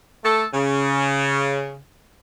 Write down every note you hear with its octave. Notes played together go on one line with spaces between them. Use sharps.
A3 A4
C#3